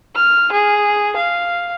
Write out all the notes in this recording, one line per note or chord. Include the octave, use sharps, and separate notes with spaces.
F6
G#4
F5